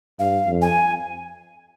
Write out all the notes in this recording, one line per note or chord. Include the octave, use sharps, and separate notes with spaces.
G2 F5
F2
G#5